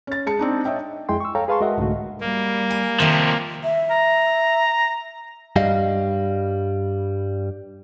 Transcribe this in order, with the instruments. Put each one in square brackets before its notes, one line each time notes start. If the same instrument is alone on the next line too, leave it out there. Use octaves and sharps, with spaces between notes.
[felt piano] C#4 A6
G#3 A5 C#7
C4 D4 D#4
C#5 D#5 E5 G5
[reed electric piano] F2 G#3 E4 G5 C6
C#6 E6
A4 C#5 F5 G5 A#5
G#4 B4 F5 A5 C6 C#6
G#3 F#4 A#4 D#5 E5 F#5
C2 G#2 D3 A3 F#4
[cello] G3 [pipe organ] A#3
[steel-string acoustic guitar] G#5
[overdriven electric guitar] C3 F3 [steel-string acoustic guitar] D#3 A#4 E5
[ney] E5
[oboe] A#5
[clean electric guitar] G2 G3 D#5 F5